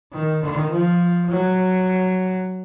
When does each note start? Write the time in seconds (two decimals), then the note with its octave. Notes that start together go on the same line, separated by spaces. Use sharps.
0.13 D#3
0.43 D#3
0.71 F3
1.30 F#3